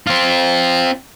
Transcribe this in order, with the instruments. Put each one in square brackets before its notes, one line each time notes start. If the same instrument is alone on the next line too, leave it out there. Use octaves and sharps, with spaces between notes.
[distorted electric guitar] C4 F4